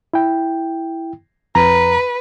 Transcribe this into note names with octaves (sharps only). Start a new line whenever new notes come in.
E4 G5
F2 B4 A#5